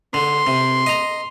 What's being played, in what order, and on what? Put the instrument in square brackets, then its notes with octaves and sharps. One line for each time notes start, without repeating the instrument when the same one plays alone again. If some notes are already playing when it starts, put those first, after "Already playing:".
[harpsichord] D3 [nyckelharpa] C6
[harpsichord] C3
D#5 A#5